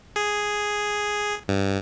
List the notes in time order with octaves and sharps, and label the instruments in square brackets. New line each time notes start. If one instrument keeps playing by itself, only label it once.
[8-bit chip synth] G#4
G2